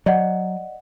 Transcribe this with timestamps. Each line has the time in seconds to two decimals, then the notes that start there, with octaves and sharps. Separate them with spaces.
0.06 F#3 D5 D#5 F#5